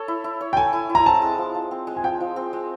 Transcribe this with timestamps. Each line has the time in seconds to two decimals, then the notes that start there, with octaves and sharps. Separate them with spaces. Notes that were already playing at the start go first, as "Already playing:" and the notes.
Already playing: A4 C#5
0.08 E4
0.24 E4
0.41 C#5
0.53 G5
0.57 A4 G#5
0.73 E4
0.89 E4
0.95 A#5
1.06 C4 A5
1.22 G#3
1.38 F3
1.55 F3
1.71 C4
1.87 G#3
1.97 G#5
2.04 F3 G5
2.20 F3
2.36 C4
2.53 G#3